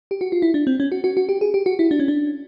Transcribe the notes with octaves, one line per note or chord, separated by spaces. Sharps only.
G4
F#4
F4
E4
D4
C4
C#4
F#4
F#4
F#4
G4
G#4
G4
F#4
E4
D4
C#4
D4